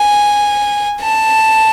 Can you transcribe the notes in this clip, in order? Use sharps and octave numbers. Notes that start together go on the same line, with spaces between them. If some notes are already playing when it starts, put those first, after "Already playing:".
Already playing: G#5
A5